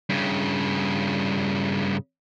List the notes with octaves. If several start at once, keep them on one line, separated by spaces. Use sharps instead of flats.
G2 C#3